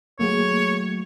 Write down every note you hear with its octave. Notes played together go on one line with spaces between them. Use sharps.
F#3 A3 A#3 G#4 C#5